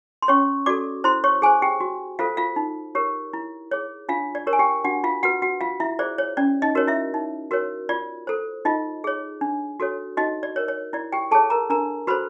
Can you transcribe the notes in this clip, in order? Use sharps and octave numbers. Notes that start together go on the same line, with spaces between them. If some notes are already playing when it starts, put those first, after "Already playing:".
C6
C#4 C#5 C#6
F#4 A4 D5 D6
E4 C5 C6
C#5 C#6
G#4 C5 G#5
G4 G5
F#4
F4 A4 C5 F5
F4 F5
D#4
G4 A#4 C#5
E4
G#4 C#5
D4 F4 F5
D5
G4 A#4 C#5
G#5
G4 G5
D4 F#4 F#5
F4 F5
F#4 B4 F#5
F#4 F#5
F4 F5
E4 E5
G#4 C5 D5
C#5
C#4 D5
D#4 D#5
F#4 A#4 C#5
E4 E5
D#4
F#4 A#4 C#5
F4 D5
A4 C5
D#4 F4 D#5
G#4 C#5
D4
F#4 A4 C#5
D#4 F#4 D#5
D5
A#4 C#5
C#5
E4 D5
G4 G5
G#4 A4 C#5 A5
A#4 A#5
D4 A#4 A#5
F#4 A4 B4 C5 B5